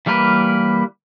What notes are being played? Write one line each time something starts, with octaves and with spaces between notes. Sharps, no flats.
E3 G3 A#3 A#4 B4